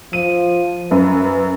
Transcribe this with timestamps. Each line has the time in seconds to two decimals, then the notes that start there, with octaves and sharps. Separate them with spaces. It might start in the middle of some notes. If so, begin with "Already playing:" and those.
0.13 F3 D#7
0.91 F#2 B4